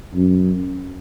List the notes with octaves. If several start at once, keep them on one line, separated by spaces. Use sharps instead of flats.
F#2